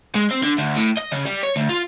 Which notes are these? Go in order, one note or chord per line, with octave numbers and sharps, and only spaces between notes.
G#3
C4
D3
D2
A2
D#5
C#3
G3
C#5
D2
F4